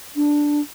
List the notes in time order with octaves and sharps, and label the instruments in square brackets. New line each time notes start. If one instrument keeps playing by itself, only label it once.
[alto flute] D4